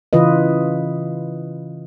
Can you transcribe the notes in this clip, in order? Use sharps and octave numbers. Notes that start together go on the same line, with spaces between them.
C#3 E3 F4 B4 D#5